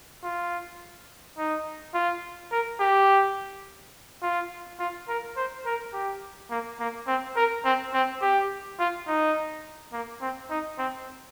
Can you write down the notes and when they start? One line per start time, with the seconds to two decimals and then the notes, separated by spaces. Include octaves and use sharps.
0.24 F4
1.38 D#4
1.94 F4
2.52 A#4
2.80 G4
4.22 F4
4.79 F4
5.09 A#4
5.37 C5
5.65 A#4
5.94 G4
6.50 A#3
6.80 A#3
7.07 C4
7.36 A#4
7.65 C4
7.94 C4
8.21 G4
8.79 F4
9.07 D#4
9.93 A#3
10.21 C4
10.50 D#4
10.78 C4